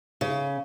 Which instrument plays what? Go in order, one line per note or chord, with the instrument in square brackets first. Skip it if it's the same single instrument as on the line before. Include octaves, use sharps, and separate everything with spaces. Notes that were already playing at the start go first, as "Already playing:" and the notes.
[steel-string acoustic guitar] C#3